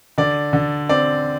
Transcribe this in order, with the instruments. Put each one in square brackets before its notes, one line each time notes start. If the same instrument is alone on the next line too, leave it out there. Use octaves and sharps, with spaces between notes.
[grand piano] D3 D5
D3
C4 D5